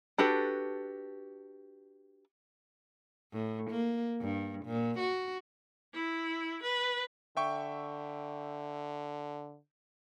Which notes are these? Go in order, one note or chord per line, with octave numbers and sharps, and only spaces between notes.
D4 F#4 G4 A4 B4
A2
A#3
G2
A#2
F#4
E4
B4
D3 E5 G5 C#6